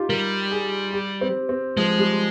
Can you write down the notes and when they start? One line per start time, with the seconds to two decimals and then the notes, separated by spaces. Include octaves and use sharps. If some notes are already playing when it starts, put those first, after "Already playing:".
Already playing: D#4 F4 G4
0.09 G3 A#4
0.51 G#4
0.93 G4
1.21 C4
1.49 C4
1.77 F3 G#3
1.98 G3